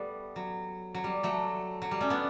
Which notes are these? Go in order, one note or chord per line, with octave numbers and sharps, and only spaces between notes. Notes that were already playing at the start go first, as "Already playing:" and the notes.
Already playing: G3 A3 B3
F#3
F#3
G3
F#3 A3
F#3
G3
A3 C#4
B3 D4